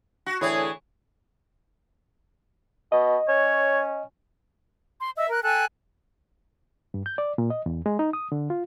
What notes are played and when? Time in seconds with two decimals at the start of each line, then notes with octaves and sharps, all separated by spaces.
0.26 F#4
0.41 A2 D3 E3 G#4 C#5
2.92 B2 D#5
3.28 C#4 C#5
4.99 C6
5.16 D#5 E5 E6
5.29 A#4 F#6
5.43 A4 G5 G#5 F#6
6.94 G2
7.06 G6
7.18 D5
7.38 A#2
7.50 D#5
7.66 E2
7.86 G#3
7.99 D#4
8.13 D#6
8.32 D3
8.50 F4